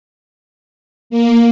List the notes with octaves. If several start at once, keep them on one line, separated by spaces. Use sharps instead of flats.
A#3